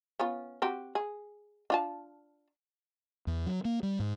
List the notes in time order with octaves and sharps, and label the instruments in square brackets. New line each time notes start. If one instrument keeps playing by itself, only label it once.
[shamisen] B3 C#4 F4
C4 F#4 G4
G#4
D4 F4 A5
[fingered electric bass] E2
F#3
A#3
G3
G#2